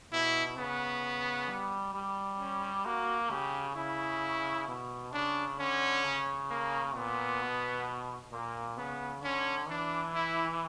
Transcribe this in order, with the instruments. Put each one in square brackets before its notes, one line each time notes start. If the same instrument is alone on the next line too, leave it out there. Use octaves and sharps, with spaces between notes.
[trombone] B2 [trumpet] E4
[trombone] C#3 [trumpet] B3
[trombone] G3
G3
[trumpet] C#4
[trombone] A#3 [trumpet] F#4
[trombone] C#3 [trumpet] G4
[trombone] C#3 [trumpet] E4
[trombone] B2
[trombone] C#3 [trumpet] D4
[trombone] D3 [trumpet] C#4
[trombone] C#3
[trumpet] A#3
[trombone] A#2 [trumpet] B3
[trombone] B2
[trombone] A#2 [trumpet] A#3
[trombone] C#3 [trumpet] B3
[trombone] D3 [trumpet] C#4
[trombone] E3 [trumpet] D4
[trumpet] E4